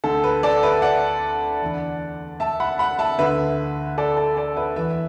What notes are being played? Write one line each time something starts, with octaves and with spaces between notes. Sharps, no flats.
D2 D3 A4
B4
A4 D5
B4 E5
D5 F#5
E2 D3
E5 A5
F#5 B5
F#5 B5
E5 A5
D2 D3 B4 E5
A4 D5
A4
A4 D5
B4 E5
E2 E3 B4 E5